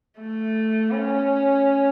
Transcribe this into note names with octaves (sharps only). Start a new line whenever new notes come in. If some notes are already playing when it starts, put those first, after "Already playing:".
A3
C#4